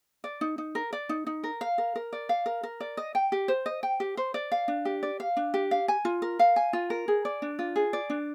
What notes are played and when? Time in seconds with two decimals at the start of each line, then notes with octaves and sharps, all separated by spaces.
0.24 D5
0.41 D#4
0.58 D#4
0.75 A#4
0.93 D5
1.09 D#4
1.27 D#4
1.43 A#4
1.61 F5
1.78 A#4
1.96 A#4
2.13 D5
2.29 F5
2.46 A#4
2.63 A#4
2.80 D5
2.97 D#5
3.15 G5
3.32 G4
3.48 C5
3.66 D#5
3.83 G5
4.00 G4
4.17 C5
4.34 D5
4.52 F5
4.68 D4
4.85 G4
5.03 D5
5.20 F5
5.37 D4
5.54 G4
5.71 F5
5.88 G#5
6.05 F4
6.22 A#4
6.39 F5
6.56 G#5
6.73 F4
6.90 A#4
7.08 G#4
7.25 D5
7.42 D4
7.59 F4
7.76 G#4
7.93 D5
8.10 D4